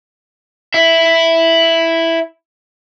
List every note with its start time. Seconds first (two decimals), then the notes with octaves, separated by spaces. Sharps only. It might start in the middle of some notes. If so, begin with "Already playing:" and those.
0.74 E4 E5